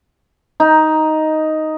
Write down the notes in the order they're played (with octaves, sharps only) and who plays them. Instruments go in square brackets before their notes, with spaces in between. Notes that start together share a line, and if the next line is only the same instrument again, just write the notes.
[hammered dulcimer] D#4